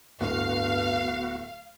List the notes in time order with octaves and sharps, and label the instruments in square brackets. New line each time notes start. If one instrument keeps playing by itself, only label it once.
[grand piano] D1 [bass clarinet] G2 [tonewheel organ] B3 F#4 [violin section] F5